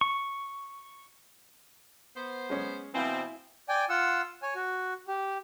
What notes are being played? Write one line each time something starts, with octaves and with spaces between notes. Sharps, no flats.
C#6
B3 C5
G#3 C#4 C#5
B2 E3 C4 E4 F5 G#5
D5 G5 G#5
F4 F#5 E6
C#5 G#5
F#4
G4